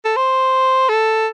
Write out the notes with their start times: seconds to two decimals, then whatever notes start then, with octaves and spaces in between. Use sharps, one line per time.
0.05 A4
0.16 C5
0.89 A4